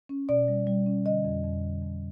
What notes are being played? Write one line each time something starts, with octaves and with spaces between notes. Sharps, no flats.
C#4
B2 D5
G3
G3
C#4
D3 D#5
F2
F2
D3
F2